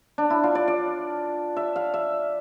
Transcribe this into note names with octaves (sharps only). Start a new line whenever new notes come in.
D4
E4
F4
D5
D5
E5
F5
E5